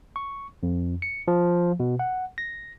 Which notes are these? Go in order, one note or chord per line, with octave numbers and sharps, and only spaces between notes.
C#6
F2
C#7
F3
B2
F#5
A#6